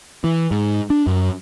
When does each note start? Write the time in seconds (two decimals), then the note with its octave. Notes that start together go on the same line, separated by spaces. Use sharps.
0.24 E3
0.51 G#2
0.90 D4
1.07 F#2